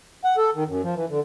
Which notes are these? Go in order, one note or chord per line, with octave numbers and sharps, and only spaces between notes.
F#5
A4
D#3
F#2
F3
E3
D3